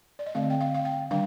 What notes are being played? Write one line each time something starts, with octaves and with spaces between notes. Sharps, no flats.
D5
D#5
D3 A3 C4 F5
G5
F5
F5
G5
D#3 G3 D4 F5